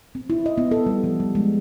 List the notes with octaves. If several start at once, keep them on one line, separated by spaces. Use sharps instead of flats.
C4
E4
D#5
B3
A4
G3
F3
G3
G#3